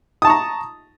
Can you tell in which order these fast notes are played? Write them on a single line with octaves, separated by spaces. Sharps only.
D#6 A5 C#6 A#5